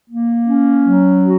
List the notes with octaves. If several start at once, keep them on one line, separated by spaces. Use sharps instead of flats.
A#3
C#4
F#3
F#4